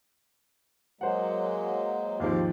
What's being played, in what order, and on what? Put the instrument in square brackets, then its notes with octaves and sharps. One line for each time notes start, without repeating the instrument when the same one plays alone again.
[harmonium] F#3 G#3 A#3 [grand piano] C5 F#5
[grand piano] D#2 G#2 F3 [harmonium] C4 G4 F5